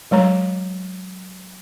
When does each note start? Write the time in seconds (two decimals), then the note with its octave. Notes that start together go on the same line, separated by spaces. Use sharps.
0.11 F#3 G#3 C#5 A#5